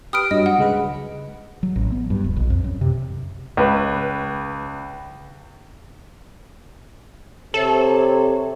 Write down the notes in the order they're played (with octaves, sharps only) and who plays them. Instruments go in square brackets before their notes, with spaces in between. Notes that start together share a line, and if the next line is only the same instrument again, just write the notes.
[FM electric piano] G4 B4 [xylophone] D#6 F6 D7
[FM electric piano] G2 F#3 [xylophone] D#5
[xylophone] F#5
[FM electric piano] C#2 G#3 B4
[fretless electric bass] F#3
A1
B3
G2
D1
A#1
F2
F#2
C3
[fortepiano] C#2 B4
[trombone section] C3 [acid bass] A4 [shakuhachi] C#5